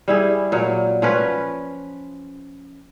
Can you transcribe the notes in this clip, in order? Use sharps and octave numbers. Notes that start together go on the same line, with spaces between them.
G3 E4 G#4
A#2 F#3
F3 C#4 B4